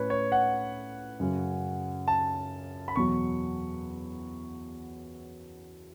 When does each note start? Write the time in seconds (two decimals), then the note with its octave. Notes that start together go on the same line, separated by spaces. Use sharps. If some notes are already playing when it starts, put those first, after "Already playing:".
Already playing: A2 A3 C#4 B4 C#5
0.10 C#5
0.32 F#5
1.20 F#2 C#3 F#3 C#4
2.08 A5
2.88 B5
2.96 E2 B2 F#3 C#6